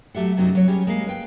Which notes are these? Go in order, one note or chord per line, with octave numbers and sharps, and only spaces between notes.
F#3 A3 G4 E5 F#5
F#2 C3 F#3 C4 C#4 D#4
F#3 C#5
G3 C#4 G4 G#4
G#3 A#3 F5
B4 G5